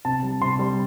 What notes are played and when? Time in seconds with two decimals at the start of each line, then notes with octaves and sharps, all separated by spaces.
0.05 C3 A5
0.23 G3
0.41 C3 C6
0.59 G3